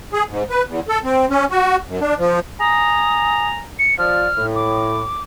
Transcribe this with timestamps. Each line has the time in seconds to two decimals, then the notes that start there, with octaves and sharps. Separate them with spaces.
0.13 G#4
0.29 G#2
0.50 B4
0.67 E2
0.89 A4
1.04 C4
1.30 C#4
1.51 F#4
1.87 F#2
2.01 D4
2.18 F3
2.60 G#5 A#5 D#6
3.79 C#7
3.99 F3 D5 F6
4.37 A2
4.56 D6